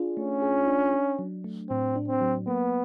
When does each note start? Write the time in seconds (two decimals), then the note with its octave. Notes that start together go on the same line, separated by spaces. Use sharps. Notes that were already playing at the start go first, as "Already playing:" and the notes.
Already playing: D4 F4 G#4
0.17 A3 C#4
0.42 G#4
0.67 D4
0.94 D4
1.19 F#3
1.44 A3
1.70 A2 C4
1.96 D4
2.08 C4
2.21 F#3
2.47 A#3 B3